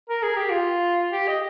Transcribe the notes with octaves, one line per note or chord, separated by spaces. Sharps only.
A#4
G#4
G4
F4
G4
D#5